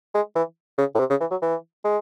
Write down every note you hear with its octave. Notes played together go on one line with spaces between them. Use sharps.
G#3
E3
C#3
A2
C3
C#3
E3
F#3
E3
G#3